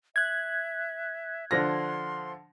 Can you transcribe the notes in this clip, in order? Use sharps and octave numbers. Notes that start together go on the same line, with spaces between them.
E5 F#6 G#6
D3 F3 C6 A#6